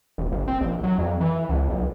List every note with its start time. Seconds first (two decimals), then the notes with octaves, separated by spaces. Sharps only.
0.18 E1
0.32 G1
0.48 C4
0.61 A#1
0.83 F#3
0.99 F2
1.21 E3
1.49 C#2
1.70 B1